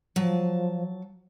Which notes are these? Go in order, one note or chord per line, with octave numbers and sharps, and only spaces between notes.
F3 F#3 A5